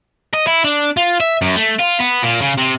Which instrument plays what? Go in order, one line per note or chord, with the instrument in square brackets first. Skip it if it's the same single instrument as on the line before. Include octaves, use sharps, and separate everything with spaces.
[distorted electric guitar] D#5
E4
D4
F4
E5
F#2
A3
F4
B3
A#2
C#3
C3